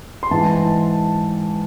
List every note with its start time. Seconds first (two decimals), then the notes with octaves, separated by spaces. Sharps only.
0.23 C6
0.31 G#2 E3 A5